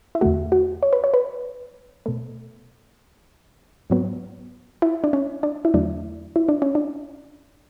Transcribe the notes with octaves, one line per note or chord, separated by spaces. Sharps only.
E4
E2 D3 A3 F#4
F#4
C#5
B4
C#5
B4
B2 A3
G#2 F#3 B3
E4
D4
C#4
D4
E4
E2 D3 F#3 A3 D4
E4
D4
C#4
D4